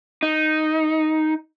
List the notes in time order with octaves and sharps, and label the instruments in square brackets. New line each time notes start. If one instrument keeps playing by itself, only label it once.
[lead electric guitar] D#4